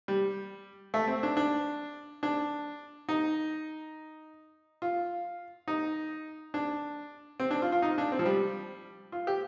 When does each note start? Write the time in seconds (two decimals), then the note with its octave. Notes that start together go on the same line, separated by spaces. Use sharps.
0.08 G3
0.94 A3
1.08 C4
1.23 D4
1.37 D4
2.23 D4
3.09 D#4
4.82 F4
5.68 D#4
6.54 D4
7.40 C4
7.51 D4
7.62 F4
7.72 F4
7.82 D#4
7.98 D4
8.12 C4
8.19 F3
8.25 G3
9.12 F4
9.27 G4